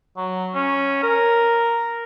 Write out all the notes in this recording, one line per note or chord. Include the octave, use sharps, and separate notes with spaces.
F#3
C#4
A#4